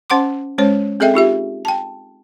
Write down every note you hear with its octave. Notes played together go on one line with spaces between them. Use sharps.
C#4 C5 F#5 C6 D6
G#3 C#4 C5 C#5
C4 G#4 A4 D#5 E5 G5
D#4 F4 G4 E5
G5 A5